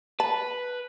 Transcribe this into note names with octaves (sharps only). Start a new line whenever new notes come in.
B4 A5